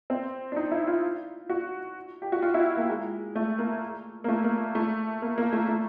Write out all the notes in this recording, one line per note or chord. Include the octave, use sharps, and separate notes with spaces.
C4
D4
D#4
E4
F4
F#4
G4
F#4
F4
E4
A#3
G#3
A3
A#3
A#3
A3
A#3
A3
A#3
A#3
A3
A3